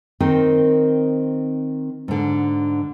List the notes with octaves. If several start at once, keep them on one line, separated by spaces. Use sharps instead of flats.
D#3 C4 D#4 A#4 C5
G#2 D3